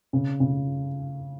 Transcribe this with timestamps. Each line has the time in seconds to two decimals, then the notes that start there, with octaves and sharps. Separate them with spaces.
0.13 C#3
0.40 C#3